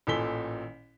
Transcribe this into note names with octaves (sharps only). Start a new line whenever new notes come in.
A1 A#2 A4 G#5 B6 G7